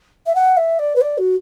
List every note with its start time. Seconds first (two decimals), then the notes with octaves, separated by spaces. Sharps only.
0.26 E5
0.35 F#5
0.57 E5
0.79 D5
0.95 B4
1.01 D5
1.17 F#4